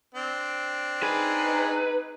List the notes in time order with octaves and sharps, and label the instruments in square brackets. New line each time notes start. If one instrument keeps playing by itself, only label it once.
[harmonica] C4 D4
[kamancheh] D#4 [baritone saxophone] G#4 [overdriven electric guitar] B4